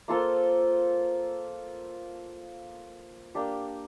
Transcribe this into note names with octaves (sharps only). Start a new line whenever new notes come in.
A#3 F4 A4 C5
A#3 D4 G4